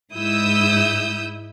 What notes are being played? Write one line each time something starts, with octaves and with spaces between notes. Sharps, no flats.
G#2 E4 D#6 E6 G6